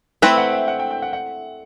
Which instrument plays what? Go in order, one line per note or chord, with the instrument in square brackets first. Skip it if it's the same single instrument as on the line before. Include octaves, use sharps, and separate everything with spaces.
[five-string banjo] A3 C4 E4 B4 [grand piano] G5
[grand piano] F#5
E5
F#5
G5
G5
F#5
F#5